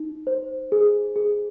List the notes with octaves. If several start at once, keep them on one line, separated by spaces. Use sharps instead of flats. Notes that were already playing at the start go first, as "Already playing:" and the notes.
Already playing: D#4
C5
G#4
G#4